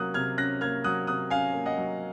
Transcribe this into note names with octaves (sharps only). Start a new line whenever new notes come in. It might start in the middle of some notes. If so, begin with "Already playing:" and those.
Already playing: C3 F#3 A#3 C#4 D#6 F#6
C3 F6 G#6
C#4 F#6 A#6
A#3 F6 G#6
F#3 D#6 F#6
C3 D#6 F#6
C#4 F5 G#5
A#3
D#5 F#5
F#3